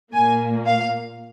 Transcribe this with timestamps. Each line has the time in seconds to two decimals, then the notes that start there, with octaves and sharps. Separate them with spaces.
0.13 A#2 A#3 G#5
0.66 F5